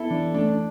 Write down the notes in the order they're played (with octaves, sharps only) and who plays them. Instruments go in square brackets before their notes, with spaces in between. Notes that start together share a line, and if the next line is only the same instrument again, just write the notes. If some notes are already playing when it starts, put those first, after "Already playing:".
Already playing: [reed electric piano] B3 [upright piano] E4 A4
[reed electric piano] E3 [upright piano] D4
[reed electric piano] A3 [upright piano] D4
[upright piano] D4